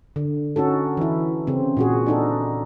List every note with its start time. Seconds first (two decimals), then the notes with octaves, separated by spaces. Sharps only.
0.16 D3
0.56 C#4 D#4 F#4 A4
0.97 E3 E4
1.47 C#3 C4
1.77 A#2 F#4 G#4
2.06 D4 D#4 A4